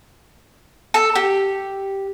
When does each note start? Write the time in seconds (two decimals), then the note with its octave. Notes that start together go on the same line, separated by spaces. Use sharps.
0.94 A4
1.15 G4